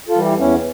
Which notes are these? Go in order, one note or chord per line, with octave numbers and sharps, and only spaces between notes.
F4 A4
E3 G3
E4 G4
E2 C#4 E4